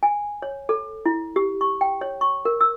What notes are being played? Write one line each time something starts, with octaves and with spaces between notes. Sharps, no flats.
G#5
C#5
A4
E4
G4
C#6
G5
C#5
C#6
A#4
E6